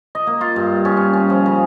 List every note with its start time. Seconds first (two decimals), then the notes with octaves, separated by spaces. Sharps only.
0.15 D#5
0.27 A#3
0.41 F4
0.56 G2
0.85 C#4
0.97 C#4
1.13 C#4
1.30 F3
1.46 C#3